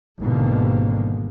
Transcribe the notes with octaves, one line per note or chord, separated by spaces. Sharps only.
G#1 E2 B2 D3 G3 A#3